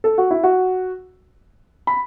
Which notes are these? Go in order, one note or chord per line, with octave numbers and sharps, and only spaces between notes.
A4
F#4
E4
F#4
B5